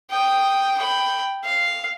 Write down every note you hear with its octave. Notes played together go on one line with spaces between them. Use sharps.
G5 D#6
G5 B5
F5